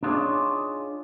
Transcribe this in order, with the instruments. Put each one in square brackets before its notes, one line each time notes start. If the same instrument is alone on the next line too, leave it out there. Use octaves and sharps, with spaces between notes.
[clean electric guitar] D4 D#4 F4 G#4 C#5 D5